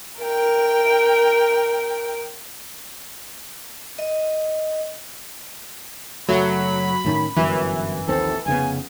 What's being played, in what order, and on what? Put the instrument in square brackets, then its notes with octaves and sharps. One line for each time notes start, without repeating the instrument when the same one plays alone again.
[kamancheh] A#4 G5
[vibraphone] D#5
[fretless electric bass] F#1 A3 [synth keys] F#3 [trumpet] B5
[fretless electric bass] A2 D#3 C#4
[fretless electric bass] G1 F#2 [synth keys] E3
[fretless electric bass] A#1 D#2 C4 [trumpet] A4
[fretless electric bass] F1 C#3 B3 [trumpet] G#5